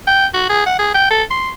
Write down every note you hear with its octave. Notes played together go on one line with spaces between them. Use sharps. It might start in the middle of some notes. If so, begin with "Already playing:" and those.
G5
F#4
G#4
F#5
G#4
G5
A4
C6